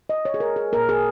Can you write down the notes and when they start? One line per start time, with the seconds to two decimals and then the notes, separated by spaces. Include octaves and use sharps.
0.09 D#5
0.25 C#5
0.34 G#4
0.40 A#4
0.56 G#4
0.72 A#3 A#4
0.76 A#2
0.89 G#4